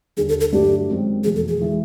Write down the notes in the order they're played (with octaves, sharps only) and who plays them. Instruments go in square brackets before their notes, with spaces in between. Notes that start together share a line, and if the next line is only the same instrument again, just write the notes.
[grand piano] D#2 D3 G3 [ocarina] G#4
[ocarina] A4
A4
[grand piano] G2 D3 F#3 A3 D4 [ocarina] G4
[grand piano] F#1 F#2 D#3 G#3 C4
[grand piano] F1 E2 B2 [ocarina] G#4
[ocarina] A4
G#4
[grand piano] E3 G#3